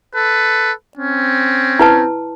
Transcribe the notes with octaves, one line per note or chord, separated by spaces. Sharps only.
A4 B4
C4 C#4
E4 B4 A5